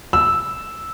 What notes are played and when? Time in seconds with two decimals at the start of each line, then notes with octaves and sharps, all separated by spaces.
0.13 E6